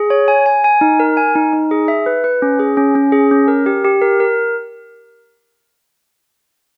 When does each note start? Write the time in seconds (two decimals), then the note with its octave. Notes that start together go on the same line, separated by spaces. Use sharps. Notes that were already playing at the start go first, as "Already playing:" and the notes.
Already playing: G#4
0.10 C#5
0.28 G#5
0.46 G#5
0.64 G#5
0.81 D#4
1.00 A#4
1.17 G#5
1.35 D#4
1.53 D#4
1.71 G#4
1.88 E5
2.06 B4
2.24 B4
2.42 C#4
2.59 G#4
2.77 C#4
2.95 C#4
3.12 G#4
3.31 C#4
3.48 A#4
3.66 G4
3.85 G4
4.01 A#4
4.20 A#4